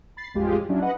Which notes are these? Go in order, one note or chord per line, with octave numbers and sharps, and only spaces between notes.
B5 A6 C7
A1 F2 G#3 F4 G4 G#4
F#3 C#4 D4 E4
B4 D#5 F#5